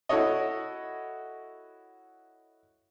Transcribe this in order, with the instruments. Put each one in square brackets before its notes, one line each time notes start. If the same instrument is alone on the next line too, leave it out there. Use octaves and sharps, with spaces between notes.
[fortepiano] E4 F#4 A4 C#5 D#5